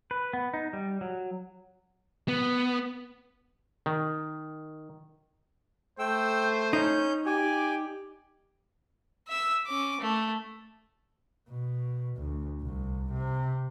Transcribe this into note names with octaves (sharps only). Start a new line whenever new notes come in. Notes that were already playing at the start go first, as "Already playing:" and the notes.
B4
B3
D#4
G3
F#3
B3
D#3
A3 C5 G5 E6
C#4 D#4 G6
G4 D5 G#5
E5 E6
C#4 D6
A3
B2
D2
C2
C3